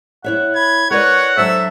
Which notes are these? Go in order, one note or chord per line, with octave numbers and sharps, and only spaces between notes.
E4 C#5 E5 F#5
B5 G#6
F#4 A#4 B4 C#5 D5 F#5
F#3 D4 A4 C5 E5